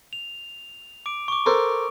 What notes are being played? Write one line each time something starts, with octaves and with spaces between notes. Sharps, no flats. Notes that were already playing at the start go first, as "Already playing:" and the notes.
F7
D6 D7
C#6 D6
A4 A#4 C5